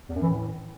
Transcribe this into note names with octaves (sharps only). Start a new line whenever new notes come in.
E2
F#2
E3
A2